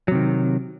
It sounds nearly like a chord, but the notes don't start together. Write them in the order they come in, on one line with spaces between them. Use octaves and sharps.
F#3 C3 D#3